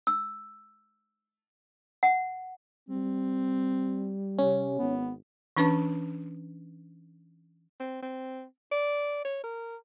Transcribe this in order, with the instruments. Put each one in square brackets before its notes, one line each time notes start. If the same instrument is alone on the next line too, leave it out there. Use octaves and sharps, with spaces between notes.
[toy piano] E6
F#5
[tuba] G3 [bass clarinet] C4
[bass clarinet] C3 [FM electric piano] C#4
[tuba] G#1 [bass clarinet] B3
[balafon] E3 C#4 D4 B4 A5 C#6
[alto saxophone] C4
C4
D5
C#5
A#4